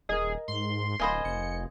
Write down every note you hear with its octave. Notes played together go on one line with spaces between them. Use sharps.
D#1 G#4 A#4 D#5
G#2 C6
D1 A#4 C5 D#5 F5 G#5 B5
F1 C#7